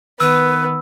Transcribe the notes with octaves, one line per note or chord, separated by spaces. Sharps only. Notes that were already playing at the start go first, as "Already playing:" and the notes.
D#3 B3 B4 E6